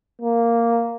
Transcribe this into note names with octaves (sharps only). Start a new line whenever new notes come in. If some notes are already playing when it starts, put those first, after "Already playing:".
A#3